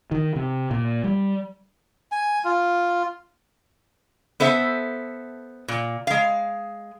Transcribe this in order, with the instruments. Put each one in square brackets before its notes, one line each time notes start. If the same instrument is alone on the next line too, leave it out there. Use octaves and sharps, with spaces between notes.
[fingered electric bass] D#3
C3
A#2
G3
[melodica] G#5
F4
[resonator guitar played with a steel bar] B3 A4 C5 E5
A#2
G#3 F5